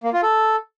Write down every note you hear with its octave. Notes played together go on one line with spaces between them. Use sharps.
A#3
F4
A4